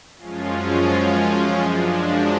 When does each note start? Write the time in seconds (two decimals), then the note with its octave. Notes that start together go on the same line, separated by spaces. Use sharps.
0.19 F#2 F3 G#3 C#4 F4
1.60 F#2 F3 G#3 D4